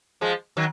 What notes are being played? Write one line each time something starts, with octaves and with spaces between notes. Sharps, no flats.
F3 G#3
D#3 F#3